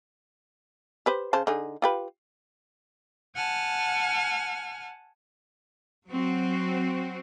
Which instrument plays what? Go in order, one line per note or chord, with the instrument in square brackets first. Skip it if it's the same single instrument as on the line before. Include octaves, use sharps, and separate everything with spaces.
[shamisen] G4 B4 C5
C#3 C5 A5
D3 D#4 G#4
F4 G4 B4
[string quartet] F#5 G#5 A5 F6
[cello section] F#3 C4 F#4